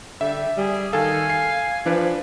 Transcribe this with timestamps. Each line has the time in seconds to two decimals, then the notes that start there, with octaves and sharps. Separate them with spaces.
0.21 D3 G3 E5
0.58 G3 G#4
0.93 D#3 A4 F5 G#5
1.30 C7
1.86 F3 D4 B4